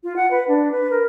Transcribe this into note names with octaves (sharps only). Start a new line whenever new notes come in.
F4
F#5
B4
D4
B4
A#4